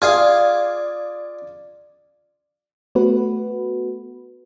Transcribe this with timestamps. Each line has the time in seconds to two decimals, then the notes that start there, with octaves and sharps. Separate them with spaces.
0.02 F4 G#4 D5 F5 G#6
2.95 A3 B3 F#4 B4